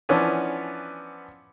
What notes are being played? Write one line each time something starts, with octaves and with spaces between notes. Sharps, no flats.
E3 F3 B3 C#4 D4